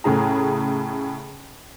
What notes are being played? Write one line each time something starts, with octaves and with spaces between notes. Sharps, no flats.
A2 C#3 G#4 A#5